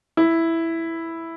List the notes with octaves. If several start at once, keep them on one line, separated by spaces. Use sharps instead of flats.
E4